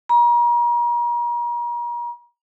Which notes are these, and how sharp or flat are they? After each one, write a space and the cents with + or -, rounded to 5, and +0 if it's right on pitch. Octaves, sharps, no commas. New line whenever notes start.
A#5 +40